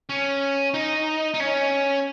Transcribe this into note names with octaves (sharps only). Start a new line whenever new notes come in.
C#4
D#4
D#4
C#4